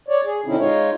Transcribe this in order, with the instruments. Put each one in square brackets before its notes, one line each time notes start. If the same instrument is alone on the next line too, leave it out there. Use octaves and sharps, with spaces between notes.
[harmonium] C#5 D5
G#4
B2 D3 C4 C#4 D#4 E4
G#3 D#4 F4 C#5